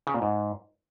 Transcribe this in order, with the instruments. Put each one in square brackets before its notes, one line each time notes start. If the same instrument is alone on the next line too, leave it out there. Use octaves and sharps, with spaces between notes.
[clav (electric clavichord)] C#3
A#2
G#2